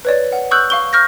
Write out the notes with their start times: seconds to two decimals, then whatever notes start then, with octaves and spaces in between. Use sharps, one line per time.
0.05 B4 C#5 D5
0.32 F#5
0.51 C#6 D#6 E6 F#6 G6 F#7
0.70 F5 C#6 G7
0.93 C#6 F6 G6 A#6